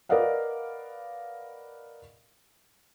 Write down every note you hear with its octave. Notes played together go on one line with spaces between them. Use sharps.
A#4 B4 D5 D#5 F5 F#5